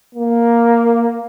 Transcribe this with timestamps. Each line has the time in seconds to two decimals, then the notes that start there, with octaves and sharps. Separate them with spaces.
0.15 A#3